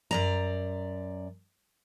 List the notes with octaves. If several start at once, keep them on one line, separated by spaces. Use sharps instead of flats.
F#2 D5 A#5